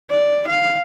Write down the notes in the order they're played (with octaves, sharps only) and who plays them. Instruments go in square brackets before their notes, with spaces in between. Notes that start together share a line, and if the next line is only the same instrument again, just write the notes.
[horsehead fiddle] D5
F5